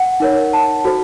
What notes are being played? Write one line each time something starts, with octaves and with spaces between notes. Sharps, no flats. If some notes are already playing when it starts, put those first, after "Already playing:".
Already playing: F#5
D#4 A#4 C#5
A5
F#4 A4 C5